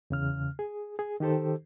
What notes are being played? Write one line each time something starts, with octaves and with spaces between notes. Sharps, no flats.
E2 C#3 F6
G#4
G#4
D#3 D#4 G4 A4 C5